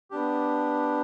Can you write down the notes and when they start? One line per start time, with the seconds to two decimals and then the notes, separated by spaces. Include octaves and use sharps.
0.11 B3 D4 G4